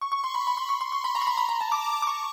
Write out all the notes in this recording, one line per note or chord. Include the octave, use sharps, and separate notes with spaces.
C#6
C#6
C6
B5
B5
C6
C#6
C6
C#6
B5
A#5
C6
B5
B5
A#5
A5
D6
D6
C#6